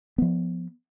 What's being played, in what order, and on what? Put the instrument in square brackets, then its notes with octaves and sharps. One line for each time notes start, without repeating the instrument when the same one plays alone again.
[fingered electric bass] F3 B3